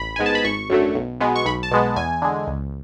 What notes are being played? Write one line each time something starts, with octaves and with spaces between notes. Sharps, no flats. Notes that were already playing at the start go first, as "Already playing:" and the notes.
Already playing: A1 B5
G#2 G#3 B3 G#5
A5
B5
G#1 C#6
F#2 D3 F#3 A3
B1
B2 G#3 B3
C#6
B1 B5
A5
B2 G#3 B3
E2 G#5
D3 G#3
C#2